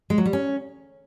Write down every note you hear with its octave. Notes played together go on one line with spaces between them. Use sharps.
G#3
F#3
G3
C#4